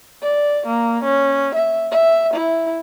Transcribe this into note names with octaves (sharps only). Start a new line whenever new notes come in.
D5
A#3
C#4
E5
E5
E4